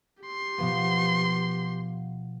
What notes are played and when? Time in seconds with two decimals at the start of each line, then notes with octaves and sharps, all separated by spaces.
0.23 G4 C6
0.58 B2 F3 B3